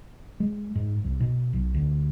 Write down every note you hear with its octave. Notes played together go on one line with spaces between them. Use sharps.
G#3
G#2
C2
B2
B1
D2